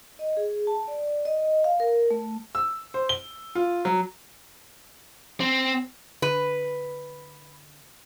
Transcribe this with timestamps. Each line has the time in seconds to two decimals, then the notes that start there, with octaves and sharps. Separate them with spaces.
0.19 D#5
0.37 G#4
0.67 A5
0.88 D5
1.25 D#5
1.64 F5
1.80 A#4
2.11 A3
2.55 E6
2.94 C5
3.09 G7
3.55 F4
3.85 F#3
5.40 C4
6.22 D3 B4